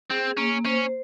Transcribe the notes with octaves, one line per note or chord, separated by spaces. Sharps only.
C4 G#4
A#3 C#4
C#4 C5